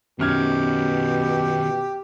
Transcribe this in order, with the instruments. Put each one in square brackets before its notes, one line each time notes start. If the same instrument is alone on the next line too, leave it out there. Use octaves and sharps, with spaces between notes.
[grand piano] F#2 F6 G#6 [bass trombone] B2 [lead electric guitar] D#3 C#4 [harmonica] G4